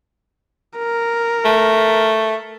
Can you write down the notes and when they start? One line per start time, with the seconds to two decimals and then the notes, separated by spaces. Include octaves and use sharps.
0.78 A#4
1.45 A3